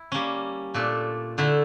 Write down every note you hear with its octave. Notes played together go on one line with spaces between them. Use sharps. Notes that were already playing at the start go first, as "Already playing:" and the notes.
Already playing: E4
G3 A#3 C#4
A#2 A3 D4 A4
D3 A3 E4